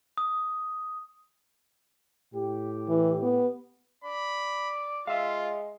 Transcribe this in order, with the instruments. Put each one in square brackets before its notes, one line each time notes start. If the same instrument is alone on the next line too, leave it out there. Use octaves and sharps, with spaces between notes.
[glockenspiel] D#6
[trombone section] A2 G4
[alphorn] E3
B3
[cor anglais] D5 [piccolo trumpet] B5
[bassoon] G#3 [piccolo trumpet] F4 [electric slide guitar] E5 F5